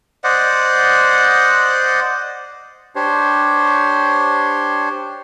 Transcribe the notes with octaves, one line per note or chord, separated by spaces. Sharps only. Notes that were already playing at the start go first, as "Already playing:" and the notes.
C5 D5 D#5 F#5
D4 G4 C5 C#5